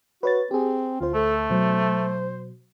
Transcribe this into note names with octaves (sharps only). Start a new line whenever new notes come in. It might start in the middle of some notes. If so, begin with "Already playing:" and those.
F#4 B4 C#5 A6
C4 G4 G#4
D2 F4 C5
A3 A4
B2 F#3 C5